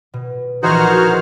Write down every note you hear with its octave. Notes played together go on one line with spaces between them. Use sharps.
B2
A#1 E3 D#4 F#4 G#4 C5 F6